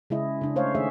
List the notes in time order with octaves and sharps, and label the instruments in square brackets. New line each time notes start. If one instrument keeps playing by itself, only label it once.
[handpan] C#3 G#3 E4 D#5
C#3 D4
A3 C5 C#5 F5
D#3 A3 G#4 E5